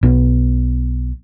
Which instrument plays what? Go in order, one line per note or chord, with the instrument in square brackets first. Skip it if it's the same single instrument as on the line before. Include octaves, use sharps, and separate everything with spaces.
[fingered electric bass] B1 B2